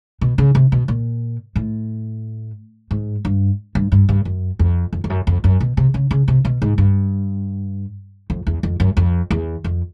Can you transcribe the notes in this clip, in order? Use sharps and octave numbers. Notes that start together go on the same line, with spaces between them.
B2
C#3
C3
B2
A#2
A2
G#2
G2
G2
G2
G2
F#2
F2
F2
F2
F#2
F2
F#2
B2
C3
C#3
C#3
C3
B2
G#2
G2
F2
E2
F2
F#2
F2
E2
F2